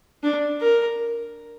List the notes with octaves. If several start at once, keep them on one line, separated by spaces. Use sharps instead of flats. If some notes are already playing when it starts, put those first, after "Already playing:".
D4
A#4